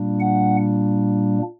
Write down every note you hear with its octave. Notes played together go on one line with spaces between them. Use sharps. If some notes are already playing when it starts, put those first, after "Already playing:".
Already playing: A#2 G3 A#3 D4
F#5